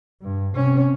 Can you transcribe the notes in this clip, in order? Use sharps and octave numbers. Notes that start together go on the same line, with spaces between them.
G2
C3 C#4